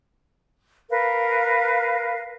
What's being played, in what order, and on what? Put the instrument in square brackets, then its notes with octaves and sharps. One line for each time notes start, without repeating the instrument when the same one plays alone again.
[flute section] A#4 B4 F5